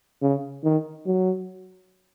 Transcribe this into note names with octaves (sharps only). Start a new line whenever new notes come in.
C#3
D#3
F#3